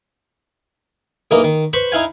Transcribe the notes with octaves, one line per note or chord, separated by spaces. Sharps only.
B1 E3 A#3 A#4 D#5
D#3
B4 C5 B5 C#6
D#4 E4 F5 G#5